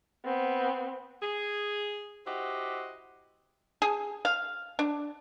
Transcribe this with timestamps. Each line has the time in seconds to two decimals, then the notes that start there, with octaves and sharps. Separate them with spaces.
0.25 B3 C4
1.22 G#4
2.26 E4 F#4 G4 C5 D#5
3.82 G#4
4.25 F5
4.79 D4